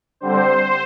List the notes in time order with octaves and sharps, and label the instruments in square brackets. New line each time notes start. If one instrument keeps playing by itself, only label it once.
[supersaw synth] D3 G3 C4 C5